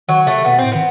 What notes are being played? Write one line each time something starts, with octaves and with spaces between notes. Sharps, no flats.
D#3 F#3
C3 A3
B2 B3
A2 C4
D#3 B3